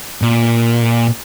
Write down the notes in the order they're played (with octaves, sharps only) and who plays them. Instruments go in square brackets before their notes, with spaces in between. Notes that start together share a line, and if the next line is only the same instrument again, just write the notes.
[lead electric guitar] A#2